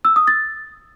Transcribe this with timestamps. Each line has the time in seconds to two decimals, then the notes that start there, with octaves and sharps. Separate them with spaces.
0.05 E6
0.16 D#6
0.28 A6